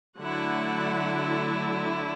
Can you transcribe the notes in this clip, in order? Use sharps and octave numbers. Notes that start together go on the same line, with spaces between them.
D3 F#3 A3 E4 F#5